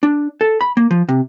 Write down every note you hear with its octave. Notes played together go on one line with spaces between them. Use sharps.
D4
A4
B5
A#3
F3
C3